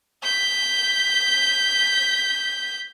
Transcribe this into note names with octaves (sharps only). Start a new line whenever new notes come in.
G6 B6